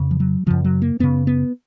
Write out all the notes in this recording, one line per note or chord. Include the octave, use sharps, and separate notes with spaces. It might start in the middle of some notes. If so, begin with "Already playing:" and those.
Already playing: F2 C#3
F3
F#3
F#2 C#3 F3
F#3
A#3
F#2 C#3 B3
B3